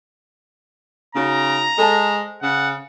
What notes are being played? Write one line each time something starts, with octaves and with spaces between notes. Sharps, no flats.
C#3 D#4 F#4 C#5 A#5
G#3 A4 C5 A5
C#3 F#5